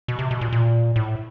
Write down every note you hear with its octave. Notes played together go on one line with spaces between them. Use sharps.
B2
C3
B2
A#2
A#2
A2